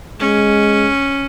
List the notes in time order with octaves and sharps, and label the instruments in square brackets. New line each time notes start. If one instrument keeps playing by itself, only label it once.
[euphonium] G#3 [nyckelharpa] C#4